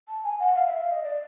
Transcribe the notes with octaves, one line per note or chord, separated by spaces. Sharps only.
A5
G#5
F#5
F5
E5
F5
D#5
D5